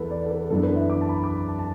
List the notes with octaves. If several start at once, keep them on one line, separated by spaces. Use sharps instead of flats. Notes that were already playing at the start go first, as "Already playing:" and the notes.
Already playing: E2 A4 B4
D5
A4
B4
F#2 E3 B3 D4 A4
B4
E5
D6
A5
B5
D6
B5
A5
A5